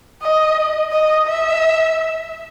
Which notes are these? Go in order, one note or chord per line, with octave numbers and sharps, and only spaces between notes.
D#5
D#5
E5